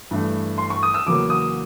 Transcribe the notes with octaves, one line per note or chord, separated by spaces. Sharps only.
G2 E3 A3
C6
C#6
D#6
E6
E2 C#3 F#3 A#3 D6
D#6